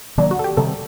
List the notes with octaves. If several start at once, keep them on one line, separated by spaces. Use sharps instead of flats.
C3 D#3 F#3 A#3 D4
F#4
A4
G4
C3 D#3 G3 A4